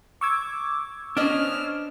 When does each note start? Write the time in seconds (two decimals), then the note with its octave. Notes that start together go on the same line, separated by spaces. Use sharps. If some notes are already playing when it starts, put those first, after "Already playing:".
0.21 C#6 D6 E6 G#6
1.17 B3 C#4 D4 C5 D#5 F6